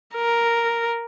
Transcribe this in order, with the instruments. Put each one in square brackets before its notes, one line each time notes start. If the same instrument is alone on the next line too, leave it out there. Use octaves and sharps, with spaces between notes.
[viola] A#4